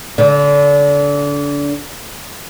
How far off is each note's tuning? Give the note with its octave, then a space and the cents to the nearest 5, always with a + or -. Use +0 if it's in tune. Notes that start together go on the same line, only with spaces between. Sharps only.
D3 -30